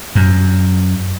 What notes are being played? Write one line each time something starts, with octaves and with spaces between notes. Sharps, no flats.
F#2